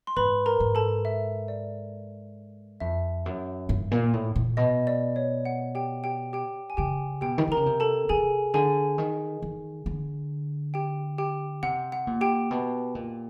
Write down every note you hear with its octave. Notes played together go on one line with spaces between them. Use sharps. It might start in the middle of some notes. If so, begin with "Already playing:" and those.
C6
G#2 B4 B5
A#4 A#5
G#2
A4 A5
E5
D5
F2 E5
F#2
G2
A#2
A2
A#2
B2 D#5
D5
C#5
F#5
G4 G5
G4 G5
G4 G5
G#5
C#3 G4 G5
B2 G4 G5
D#3
D3
C#3 A#4 A#5
C3
A4 A5
C3 G#4 G#5
D3 G#4 G#5
D#3
D#3
D3
G4 G5
G4 G5
C3 F#5
F#5
A#2
G4 G5
B2
A#2